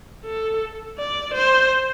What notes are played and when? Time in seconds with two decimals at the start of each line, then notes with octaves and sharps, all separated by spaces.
0.25 A4
0.98 D5
1.34 C5